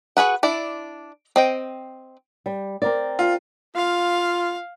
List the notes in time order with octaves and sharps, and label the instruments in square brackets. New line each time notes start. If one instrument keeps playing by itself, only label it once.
[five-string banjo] F#4 G#4 B4 F#5
D4 E4 D5
C4 D#5 G5
[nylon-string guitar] G3
C4 A#4 D5
[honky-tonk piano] F4
[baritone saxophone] F4 [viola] F5